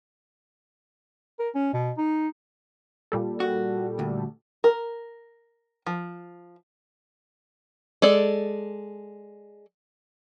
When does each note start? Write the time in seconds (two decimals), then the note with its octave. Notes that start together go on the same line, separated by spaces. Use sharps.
1.40 A#4
1.55 C#4
1.73 B2
1.97 D#4
3.12 A#2 G3 A4
3.40 F#4
3.99 D2
4.64 A#4
5.86 F3
8.02 G#3 A4 D5